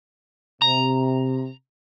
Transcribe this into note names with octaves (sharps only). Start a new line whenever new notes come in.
C3 A#5